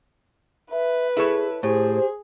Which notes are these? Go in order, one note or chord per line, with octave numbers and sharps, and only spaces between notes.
B4 E5
E4 G#4 A4 C#5
A2 G4 G#4 C5